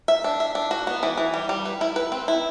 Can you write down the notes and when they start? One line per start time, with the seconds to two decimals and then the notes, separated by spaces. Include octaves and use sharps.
0.08 E5
0.24 D4
0.40 E5
0.55 D4
0.71 F#4
0.87 B3
1.03 E3
1.17 E3
1.34 G3
1.49 G3
1.65 B4
1.81 E4
1.96 B4
2.12 C4
2.28 E4